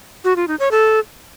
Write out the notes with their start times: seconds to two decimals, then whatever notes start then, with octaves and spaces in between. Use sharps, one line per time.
0.24 F#4
0.36 F4
0.48 D#4
0.60 C#5
0.71 A4